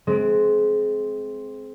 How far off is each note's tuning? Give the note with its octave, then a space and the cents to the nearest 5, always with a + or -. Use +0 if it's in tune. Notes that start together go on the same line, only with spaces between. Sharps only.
G#3 +30 C4 +0